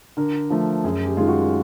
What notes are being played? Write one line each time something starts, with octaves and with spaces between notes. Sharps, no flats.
D3 A#4
F3 A3
F#2 G#4
G4
D#3 G#3 F4
F#4